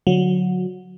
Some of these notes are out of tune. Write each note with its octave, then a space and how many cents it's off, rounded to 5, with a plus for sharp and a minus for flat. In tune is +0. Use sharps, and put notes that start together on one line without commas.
D3 -10 F#3 -20